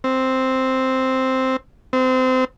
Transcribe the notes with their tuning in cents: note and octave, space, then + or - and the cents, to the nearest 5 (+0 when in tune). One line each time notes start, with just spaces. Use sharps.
C4 +0
C4 -25